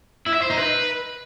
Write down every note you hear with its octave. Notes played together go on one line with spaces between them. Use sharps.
E4
E5
C5
D#4
B4